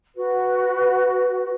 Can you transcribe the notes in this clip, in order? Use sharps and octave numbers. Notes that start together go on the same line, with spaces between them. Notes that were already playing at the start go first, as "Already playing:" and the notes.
F#4 B4